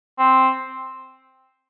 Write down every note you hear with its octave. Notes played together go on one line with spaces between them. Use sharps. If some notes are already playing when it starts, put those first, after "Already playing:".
C4